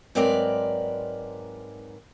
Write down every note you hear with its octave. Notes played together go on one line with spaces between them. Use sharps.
G#2 F#3 C4 A#4 B4 D5